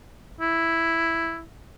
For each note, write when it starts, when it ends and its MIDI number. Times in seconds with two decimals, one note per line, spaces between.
0.41 1.43 64